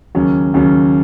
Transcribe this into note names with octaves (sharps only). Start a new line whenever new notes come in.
D#2 C#3 F#3 C#4
D#2 C#3 F#3 C#4